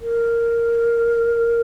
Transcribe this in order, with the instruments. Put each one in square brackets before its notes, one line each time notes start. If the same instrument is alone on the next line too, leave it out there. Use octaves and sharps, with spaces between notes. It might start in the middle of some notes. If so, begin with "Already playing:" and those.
[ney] A#4